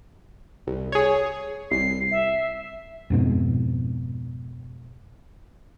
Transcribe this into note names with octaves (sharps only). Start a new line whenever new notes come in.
C2
G#4 C#5
C2 C7
E5
F2 G#2 B2